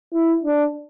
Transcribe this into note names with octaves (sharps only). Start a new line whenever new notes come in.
E4
D4